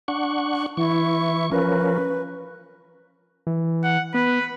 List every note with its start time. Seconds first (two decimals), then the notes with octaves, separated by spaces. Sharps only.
0.08 D4 F#5 C#6
0.77 E3 E4 C#6
1.52 F3 C#4 A#4 B4
3.47 E3
3.84 F#5
4.14 B3 B4